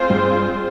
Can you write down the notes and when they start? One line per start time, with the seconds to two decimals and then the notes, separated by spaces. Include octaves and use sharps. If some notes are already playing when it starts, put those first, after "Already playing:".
Already playing: G#3 C4 F4 G#4 C5
0.10 G2 G3